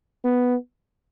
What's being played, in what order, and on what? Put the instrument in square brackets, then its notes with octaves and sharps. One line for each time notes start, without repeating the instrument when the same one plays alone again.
[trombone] B3